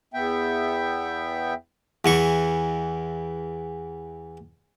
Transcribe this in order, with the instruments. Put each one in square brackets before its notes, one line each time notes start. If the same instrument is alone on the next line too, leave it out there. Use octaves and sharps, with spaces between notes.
[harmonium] E2 B3 E5 G5
[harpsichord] E2 E3 C#6